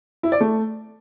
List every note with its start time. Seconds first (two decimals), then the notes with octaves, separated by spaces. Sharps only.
0.23 E4
0.32 D5
0.41 A3